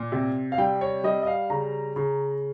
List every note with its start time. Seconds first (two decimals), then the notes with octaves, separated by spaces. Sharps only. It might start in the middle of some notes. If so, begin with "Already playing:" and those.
Already playing: A#2
0.12 C3
0.52 F5
0.58 G3 G5
0.81 C#5
1.04 G3 D#5
1.23 D#5
1.27 F5
1.50 C#3 A#5
1.96 C#3